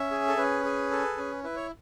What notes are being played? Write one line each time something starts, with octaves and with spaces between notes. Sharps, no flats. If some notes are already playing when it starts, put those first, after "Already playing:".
Already playing: C#4 E5
G#4
A4
C#4 B4
G#4
A4
C#4
E4 B4
C#5